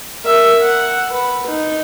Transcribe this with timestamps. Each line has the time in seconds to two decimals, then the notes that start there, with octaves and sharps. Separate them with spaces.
0.24 A#4 E5
0.62 F#5
1.11 B4
1.48 D#4